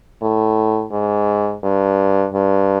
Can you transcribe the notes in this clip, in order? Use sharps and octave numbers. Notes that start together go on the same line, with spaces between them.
A2
G#2
G2
G2